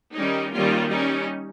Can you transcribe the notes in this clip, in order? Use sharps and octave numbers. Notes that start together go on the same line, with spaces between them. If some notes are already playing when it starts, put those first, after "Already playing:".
D#3 G3 C#4 D#4
D#3 G3 A#3 C#4 F4
G3 C#4 D#4